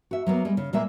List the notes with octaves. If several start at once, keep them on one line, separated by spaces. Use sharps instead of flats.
F#4 E5
F#3 A#3 B3
G3 G#3
C#3
A#2 G#3 A#3 E5